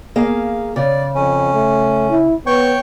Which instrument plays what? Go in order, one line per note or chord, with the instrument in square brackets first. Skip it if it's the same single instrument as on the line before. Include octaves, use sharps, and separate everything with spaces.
[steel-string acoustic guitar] A#3 G#4 F5
[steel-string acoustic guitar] C#3 [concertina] D5
[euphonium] F2 [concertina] C#4
[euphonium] A3
E4
[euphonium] B3 [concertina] C#5 G5 C#6